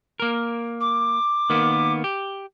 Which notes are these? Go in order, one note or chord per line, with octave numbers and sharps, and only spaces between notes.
A#3 A#4
D6
D#3 A#3 B3
G4